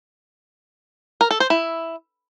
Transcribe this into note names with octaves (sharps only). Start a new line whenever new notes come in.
A#4
A4
C5
E4